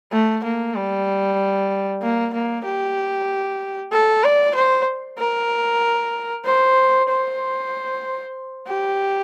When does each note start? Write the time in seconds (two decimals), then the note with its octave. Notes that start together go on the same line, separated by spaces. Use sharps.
0.12 A3
0.44 A#3
0.75 G3
2.02 A#3
2.33 A#3
2.65 G4
3.92 A4
4.24 D5
4.55 C5
5.18 A#4
6.45 C5
7.09 C5
8.67 G4